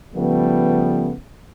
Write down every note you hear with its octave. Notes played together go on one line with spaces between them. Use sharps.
C#3 F3 G3 A3 B3